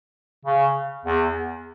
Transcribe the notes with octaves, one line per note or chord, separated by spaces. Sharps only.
C#3
E2